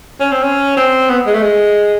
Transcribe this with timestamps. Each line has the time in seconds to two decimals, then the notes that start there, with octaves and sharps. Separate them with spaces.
0.20 C#4
0.32 C4
0.43 C#4
0.77 C4
1.10 B3
1.26 G#3
1.34 A3
1.42 G#3